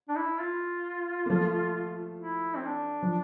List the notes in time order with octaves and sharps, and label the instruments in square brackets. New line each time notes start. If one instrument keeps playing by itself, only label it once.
[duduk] D4
E4
F4
[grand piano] A#3
F3 A3
[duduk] E4
C4
D4
[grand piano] F3